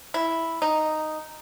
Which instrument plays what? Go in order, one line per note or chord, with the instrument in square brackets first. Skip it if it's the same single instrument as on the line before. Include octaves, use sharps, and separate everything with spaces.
[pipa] E4
D#4